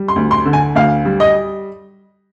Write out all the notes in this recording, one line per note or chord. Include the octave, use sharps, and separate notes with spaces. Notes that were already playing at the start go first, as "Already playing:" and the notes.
Already playing: G3
C6
D2
C6
D3
G#5
D2 F5
G3
D#5